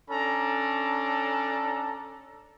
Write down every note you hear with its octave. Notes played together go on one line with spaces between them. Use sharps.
C#4 D4 A4 A#5